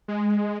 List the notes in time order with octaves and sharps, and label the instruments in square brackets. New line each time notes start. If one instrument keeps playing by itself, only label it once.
[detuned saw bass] G#3